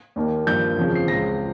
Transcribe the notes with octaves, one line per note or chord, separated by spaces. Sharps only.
D#2 D#3 A#3
G2 F3 A#3 G6
F2 C#3 F3 C4
C7
C#2 C#3 F3 A#6